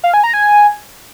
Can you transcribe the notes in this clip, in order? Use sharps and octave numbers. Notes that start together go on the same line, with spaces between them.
F5
G#5
A#5
G#5